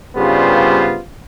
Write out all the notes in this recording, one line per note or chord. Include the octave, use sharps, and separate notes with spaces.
G2 C#3 G3 B3 F4 C5